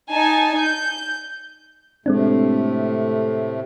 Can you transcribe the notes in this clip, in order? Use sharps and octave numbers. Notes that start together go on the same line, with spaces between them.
D#4 G#5 A5
G6
A2 C3 G#3 A3 C4 D4